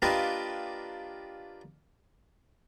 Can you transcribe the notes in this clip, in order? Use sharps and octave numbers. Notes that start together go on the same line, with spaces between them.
A#3 D4 F4 G4 B4 D#5